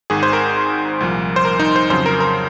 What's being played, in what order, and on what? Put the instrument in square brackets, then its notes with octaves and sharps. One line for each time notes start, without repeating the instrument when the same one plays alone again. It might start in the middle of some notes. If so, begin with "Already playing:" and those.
[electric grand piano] G#1 G#2 D#3 G#4
C5
A#4
C2 A#2 F3
C5
A#4
D#4
C5
F2 C#3 F#3 C5
A#4
A#4